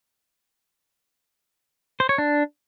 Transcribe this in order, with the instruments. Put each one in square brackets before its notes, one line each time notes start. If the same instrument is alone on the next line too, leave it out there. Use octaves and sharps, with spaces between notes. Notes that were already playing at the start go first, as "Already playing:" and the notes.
[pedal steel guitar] C5
C#5
D4